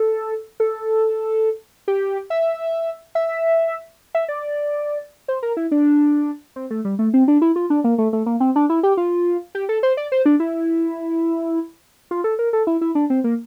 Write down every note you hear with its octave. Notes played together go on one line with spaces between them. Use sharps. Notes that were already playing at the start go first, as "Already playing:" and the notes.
Already playing: A4
A4
G4
E5
E5
E5
D5
C5
A#4
E4
D4
C4
A3
G3
A3
C4
D4
E4
F4
D4
A#3
A3
A3
A#3
C4
D4
E4
G4
F4
G4
A4
C5
D5
C5
D4
E4
F4
A4
A#4
A4
E4
E4
D4
C4
A#3